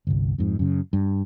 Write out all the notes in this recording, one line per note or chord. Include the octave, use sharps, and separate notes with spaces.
G1 C2
F2 G#2
F#2 C#3
G2